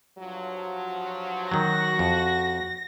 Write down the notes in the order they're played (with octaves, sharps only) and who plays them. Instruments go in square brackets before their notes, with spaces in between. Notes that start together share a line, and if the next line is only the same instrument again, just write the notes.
[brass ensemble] G2 F3 F#3
[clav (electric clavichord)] D#3 F#3 [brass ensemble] F#4 [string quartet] A#6
[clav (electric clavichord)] F2